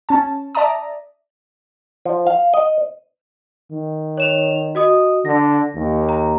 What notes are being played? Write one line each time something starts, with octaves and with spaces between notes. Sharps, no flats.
C#4 A5
D5 E5 A5 A#5 D#6
F3
F5
D#5
D#3
C#5 E7 F7
F#4 D#5 D#6
D3 A#6
D#2
A#5